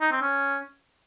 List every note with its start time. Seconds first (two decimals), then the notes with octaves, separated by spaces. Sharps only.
0.01 D#4
0.12 C4
0.22 C#4